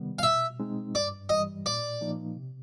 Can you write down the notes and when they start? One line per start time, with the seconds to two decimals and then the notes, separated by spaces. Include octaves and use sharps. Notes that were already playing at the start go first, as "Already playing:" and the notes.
Already playing: C3 D#3 G3 B3
0.19 F5
0.23 B2 E5
0.60 G#3 C4 D#4
0.94 G2 D5
1.29 E3 G3 D#5
1.65 A#2 D5
2.01 F3 A#3 D#4
2.36 C3